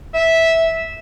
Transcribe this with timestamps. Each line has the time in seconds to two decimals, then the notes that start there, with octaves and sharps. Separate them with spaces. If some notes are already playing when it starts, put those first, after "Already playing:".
0.14 E5